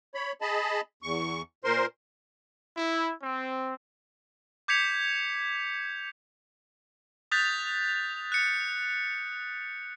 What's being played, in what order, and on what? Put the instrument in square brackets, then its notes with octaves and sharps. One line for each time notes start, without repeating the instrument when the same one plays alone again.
[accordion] C#5 B5
G#4 D#5 A5 B5
E2 C#6
A#2 A#4 C5 C6
[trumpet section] E4
C4
[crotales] D6 G6 G#6 B6 C#7 F7
D#6 F#6 G6 A6 B6 F7
F#6 C#7